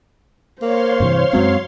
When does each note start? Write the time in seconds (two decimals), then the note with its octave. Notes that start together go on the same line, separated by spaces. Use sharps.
0.62 A#3 C5 C#5 F5 C6
1.00 G2 C3 E3
1.33 F#2 F#3 G#3 C4